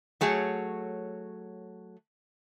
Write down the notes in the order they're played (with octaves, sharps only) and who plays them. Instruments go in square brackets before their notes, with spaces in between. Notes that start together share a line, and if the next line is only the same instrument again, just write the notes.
[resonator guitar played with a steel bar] F#3 A3 G#4 C#5